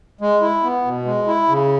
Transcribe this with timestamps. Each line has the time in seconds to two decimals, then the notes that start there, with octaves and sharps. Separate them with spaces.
0.21 G#3
0.42 E4
0.63 B3
0.85 B2
1.05 G#3
1.27 E4
1.48 C#3